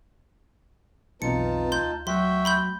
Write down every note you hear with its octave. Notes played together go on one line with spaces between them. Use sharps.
B1 F2 E3 D#4 F4 A5 C#7
D2 C6 G6
F#3 F#4 E5 G5 C6
B5 C6 G6